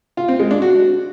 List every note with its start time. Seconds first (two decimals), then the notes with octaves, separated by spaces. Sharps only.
0.17 F4
0.28 C4
0.40 G#3
0.51 D4
0.62 F#4